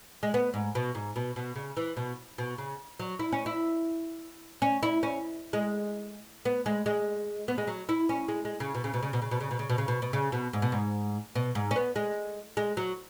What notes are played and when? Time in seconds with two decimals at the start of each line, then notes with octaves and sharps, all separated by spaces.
0.23 G#3
0.34 B3
0.54 G#2
0.75 B2
0.95 G#2
1.16 B2
1.36 B2
1.56 C#3
1.77 E3
1.97 B2
2.38 B2
2.58 C#3
2.99 F#3
3.19 E4
3.33 C#4
3.46 E4
4.62 C#4
4.83 E4
5.03 C#4
5.53 G#3
6.45 B3
6.66 G#3
6.86 G#3
7.48 B3
7.58 G#3
7.67 F#3
7.89 E4
8.09 C#4
8.28 G#3
8.45 G#3
8.60 C#3
8.75 B2
8.84 C#3
8.94 B2
9.03 C#3
9.13 B2
9.22 C#3
9.31 B2
9.40 C#3
9.51 B2
9.59 C#3
9.69 B2
9.78 C#3
9.88 B2
10.02 B2
10.13 C#3
10.32 B2
10.53 G#2
10.62 B2
10.72 G#2
11.35 B2
11.55 G#2
11.71 C#4
11.76 B3
11.96 G#3
12.57 G#3
12.77 F#3